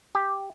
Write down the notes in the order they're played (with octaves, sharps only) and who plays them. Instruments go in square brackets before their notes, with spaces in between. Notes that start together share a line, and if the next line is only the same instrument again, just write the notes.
[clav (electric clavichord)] G4